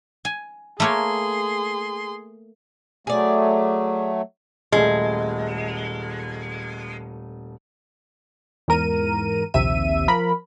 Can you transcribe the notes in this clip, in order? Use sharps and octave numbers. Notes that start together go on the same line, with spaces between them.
G#5
A3 A#3 G#4 C#5 C6
F#3 A3 G#4 D5
D#1 G#3 A3
E2 G#2 A#4 D#7
A#1 D#2 C3 E5 D#7
F3 A#4 B5